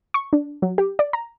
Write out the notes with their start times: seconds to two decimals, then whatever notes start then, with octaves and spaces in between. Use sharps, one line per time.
0.14 C#6
0.33 D4
0.62 F#3
0.78 G4
0.99 D5
1.13 A#5